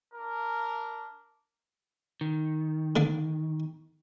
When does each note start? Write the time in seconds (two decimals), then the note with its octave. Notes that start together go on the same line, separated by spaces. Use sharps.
0.14 D4 A#4
2.21 D#3
2.96 D3 A#3 D4